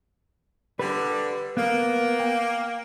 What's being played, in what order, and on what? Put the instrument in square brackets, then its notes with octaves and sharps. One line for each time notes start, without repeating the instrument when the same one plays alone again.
[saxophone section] D3 G3 [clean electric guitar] B4
[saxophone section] A#3 [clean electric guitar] B3
[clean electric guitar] G5